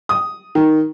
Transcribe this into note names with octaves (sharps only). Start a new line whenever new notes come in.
D#6
D#3